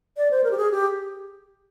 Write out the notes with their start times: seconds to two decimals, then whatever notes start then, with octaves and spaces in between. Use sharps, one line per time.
0.17 D5
0.31 C5
0.44 A#4
0.51 G4
0.57 G#4
0.71 G4